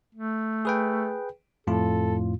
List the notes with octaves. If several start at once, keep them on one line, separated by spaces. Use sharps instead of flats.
A3
G#4 B4 G5
F2 A2 F4 A4